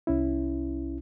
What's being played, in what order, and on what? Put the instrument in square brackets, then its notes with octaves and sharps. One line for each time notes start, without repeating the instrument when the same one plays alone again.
[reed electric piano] C2 C#4 E4